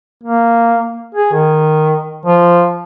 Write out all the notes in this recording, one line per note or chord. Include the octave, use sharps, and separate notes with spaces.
A#3
G#4
D#3
F3